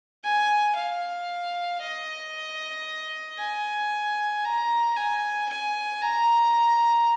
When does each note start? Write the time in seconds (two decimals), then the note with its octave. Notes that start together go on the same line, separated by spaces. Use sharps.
0.24 G#5
0.76 F5
1.82 D#5
3.39 G#5
4.45 A#5
4.96 G#5
5.49 G#5
6.02 A#5